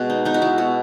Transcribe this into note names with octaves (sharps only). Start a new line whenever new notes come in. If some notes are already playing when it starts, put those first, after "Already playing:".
Already playing: B2 G#3 F#4
D#4
B3 D#4
F#4
G#3 E4
B2 F#4